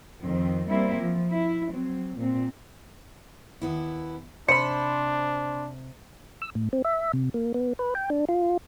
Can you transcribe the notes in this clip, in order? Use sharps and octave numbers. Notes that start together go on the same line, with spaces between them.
F2 D#3 C4
G3 A#3 C4 E4
F3
E4
F#3 C4
A#2 C4
D#2 B3 E4
C3 D4 C5 B5 C#7
E6
A2
C4
E5
C3
A#3
B3
B4
G5
D4
F4